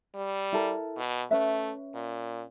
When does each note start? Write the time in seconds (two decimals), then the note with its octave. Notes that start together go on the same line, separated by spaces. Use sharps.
0.15 G3
0.53 E4 A4 A#4
0.97 B2
1.31 A3 C#4 B4 E5
1.95 A#2